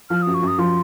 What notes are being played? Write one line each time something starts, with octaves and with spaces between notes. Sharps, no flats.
F3 F6
F#2 D#6
C#6
F#2
D#6
F3 C6